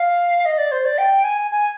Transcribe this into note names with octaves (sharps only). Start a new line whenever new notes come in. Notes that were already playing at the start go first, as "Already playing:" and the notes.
Already playing: F5
D#5
D5
C5
D5
G5
G#5
G#5